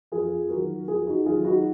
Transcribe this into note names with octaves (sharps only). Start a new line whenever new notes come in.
F2 F4 G#4
D#3 F#3 F#4 A#4
F2 F4 G#4
D#4 F#4
D#3 F#3 F4 G#4
D#4 F#4